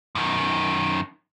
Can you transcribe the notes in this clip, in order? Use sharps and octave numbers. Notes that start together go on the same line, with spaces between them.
F#2 D#3